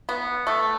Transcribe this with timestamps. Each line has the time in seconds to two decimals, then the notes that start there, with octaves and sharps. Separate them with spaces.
0.09 B3
0.47 A3